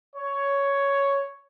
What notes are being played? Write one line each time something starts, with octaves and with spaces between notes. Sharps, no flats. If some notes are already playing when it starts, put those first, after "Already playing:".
C#5